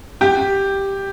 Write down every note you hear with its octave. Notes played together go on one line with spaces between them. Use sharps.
G4